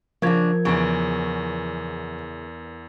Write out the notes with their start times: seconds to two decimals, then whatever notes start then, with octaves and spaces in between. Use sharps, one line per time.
0.22 C#3 F3 A#3 D4 A#4 G#6
0.65 E2 C#3 E3 D7